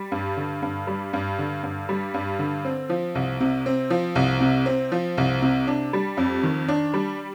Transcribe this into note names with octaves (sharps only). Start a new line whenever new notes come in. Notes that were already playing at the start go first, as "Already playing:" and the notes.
Already playing: G3
G2
D3
G2
G3
G2
D3
G2
G3
G2
D3
C4
F3
C2
C3
C4
F3
C2
C3
C4
F3
C2
C3
D4
G3
F2
D#3
D4
G3